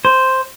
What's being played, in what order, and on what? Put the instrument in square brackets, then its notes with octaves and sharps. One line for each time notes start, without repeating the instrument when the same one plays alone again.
[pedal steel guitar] C5